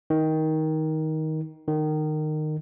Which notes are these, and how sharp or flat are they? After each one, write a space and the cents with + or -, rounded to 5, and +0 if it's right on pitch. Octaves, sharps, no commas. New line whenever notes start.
D#3 +15
D#3 -20